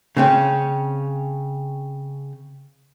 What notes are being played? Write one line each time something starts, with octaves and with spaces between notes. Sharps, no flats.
C#3 C4 C#4